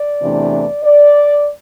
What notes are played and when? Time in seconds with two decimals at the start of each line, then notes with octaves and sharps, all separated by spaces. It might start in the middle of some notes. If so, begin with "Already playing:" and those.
Already playing: D5
0.21 E2 C3 E3 A3 D4
0.83 D5